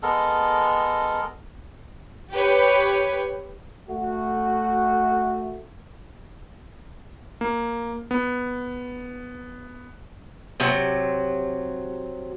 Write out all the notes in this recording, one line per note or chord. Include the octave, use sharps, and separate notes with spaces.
G#3 B3 A4 A#4
G4 B4 C#5
A3 F#4
A#3
B3
C3 F#3